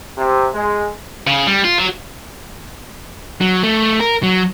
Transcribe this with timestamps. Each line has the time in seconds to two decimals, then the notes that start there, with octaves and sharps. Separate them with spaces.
0.18 C3
0.54 G#3
1.27 C#3
1.47 G3
1.64 F4
1.78 F#3
3.41 F#3
3.63 A3
4.00 A#4
4.23 F#3